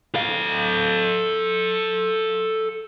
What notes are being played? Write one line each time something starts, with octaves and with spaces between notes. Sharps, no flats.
A4 F5